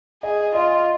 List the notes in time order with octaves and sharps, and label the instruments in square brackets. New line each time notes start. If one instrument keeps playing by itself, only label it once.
[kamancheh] G#4 [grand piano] D#5
[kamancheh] F4 [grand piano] D#5